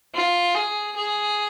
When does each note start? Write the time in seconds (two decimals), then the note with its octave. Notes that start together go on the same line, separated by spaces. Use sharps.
0.15 F4
0.55 G#4
0.96 G#4